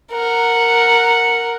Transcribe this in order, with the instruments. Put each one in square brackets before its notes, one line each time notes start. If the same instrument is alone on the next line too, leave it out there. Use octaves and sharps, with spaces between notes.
[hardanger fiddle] A#4 F#5